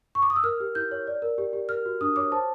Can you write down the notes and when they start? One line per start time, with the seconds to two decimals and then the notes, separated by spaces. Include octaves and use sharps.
0.15 C#6
0.22 D6
0.30 D#6
0.36 E6
0.44 A#4 F6
0.60 G4
0.75 E4 G6
0.91 C#5
1.07 D5
1.22 A#4
1.38 G4
1.53 G4
1.69 A#4 F6
1.85 F#4
2.01 D4 D#6
2.16 C#5 D6
2.31 C5 A5